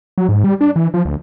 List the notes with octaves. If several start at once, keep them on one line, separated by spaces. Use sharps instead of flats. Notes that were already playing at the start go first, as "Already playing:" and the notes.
F#3
G#2
G3
D4
E3
F3
D2